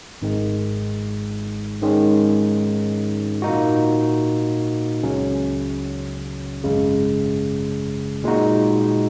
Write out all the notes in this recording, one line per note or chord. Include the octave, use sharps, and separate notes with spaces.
G#1 G#2 D#3 G#3
G#2 D#3 G#3 C#4
A#2 A#3 D#4 F#4
C#2 C#3 F#3 C#4
G#1 F#2 C#3 G#3
A#2 G#3 D#4 F#4